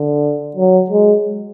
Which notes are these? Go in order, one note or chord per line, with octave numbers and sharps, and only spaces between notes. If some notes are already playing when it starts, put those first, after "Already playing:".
Already playing: D3
F#3
G#3